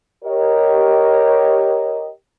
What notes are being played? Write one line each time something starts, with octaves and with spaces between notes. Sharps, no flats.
G4 A#4 C#5 D#5